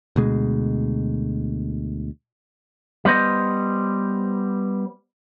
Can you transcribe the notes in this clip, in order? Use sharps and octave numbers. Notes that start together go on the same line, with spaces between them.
D2 B2 G#3
G3 B3 C5 D#5